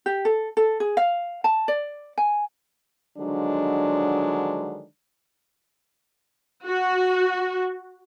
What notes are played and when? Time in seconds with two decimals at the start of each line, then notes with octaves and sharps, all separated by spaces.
0.06 G4
0.25 A4
0.57 A4
0.80 G#4
0.97 F5
1.44 A5
1.68 D5
2.18 G#5
3.18 D3 D#3 F3 F#3 G#3 D4
6.66 F#4